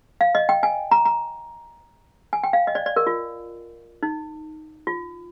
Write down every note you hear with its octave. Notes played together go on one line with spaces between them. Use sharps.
F5
D#5
G5
G#5
A#5
A#5
G#5
G5
F5
D#5
D5
D5
A#4
F4
D#4
F4